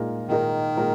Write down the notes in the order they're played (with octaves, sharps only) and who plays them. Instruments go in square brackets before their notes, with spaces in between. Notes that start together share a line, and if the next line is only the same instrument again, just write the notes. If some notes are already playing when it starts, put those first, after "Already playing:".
Already playing: [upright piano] A#2 G#3 D#4 A#4
[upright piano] A#2 G#3 D#4 A#4 [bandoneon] D#3
[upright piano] A#2 G#3 D#4 A#4